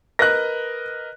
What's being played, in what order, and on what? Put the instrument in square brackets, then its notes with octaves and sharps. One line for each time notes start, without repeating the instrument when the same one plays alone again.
[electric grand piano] A#4 B4 D#5 [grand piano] F#6 A#6